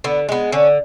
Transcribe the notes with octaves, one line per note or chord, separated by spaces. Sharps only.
D3 B3
G#3 B3
D3 C#4